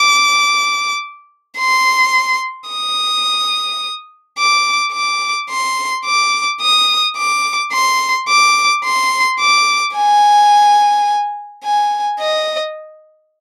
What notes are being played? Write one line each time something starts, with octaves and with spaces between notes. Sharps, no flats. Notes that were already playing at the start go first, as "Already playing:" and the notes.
Already playing: D6
C6
D#6
D6
D6
C6
D6
D#6
D6
C6
D6
C6
D6
G#5
G#5
D#5